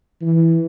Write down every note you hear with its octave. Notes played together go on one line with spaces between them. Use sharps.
E3